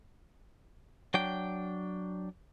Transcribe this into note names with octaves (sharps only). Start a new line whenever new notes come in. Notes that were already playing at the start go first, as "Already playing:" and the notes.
F#3 D4 G5